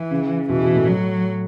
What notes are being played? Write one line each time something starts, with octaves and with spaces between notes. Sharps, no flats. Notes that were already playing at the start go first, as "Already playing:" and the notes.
Already playing: E3
C#3
B2 E3
B2
A2
F#3